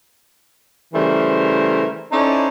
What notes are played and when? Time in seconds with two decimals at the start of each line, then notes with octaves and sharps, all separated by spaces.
0.94 C#3 E3 G3 A3 A#4 C5
2.12 C#4 D#4 E4 A4 C5 D5